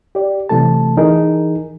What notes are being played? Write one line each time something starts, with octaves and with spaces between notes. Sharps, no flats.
G4 D5
C3 E3 A3 A4 A5
E3 D#4 G#4 A#4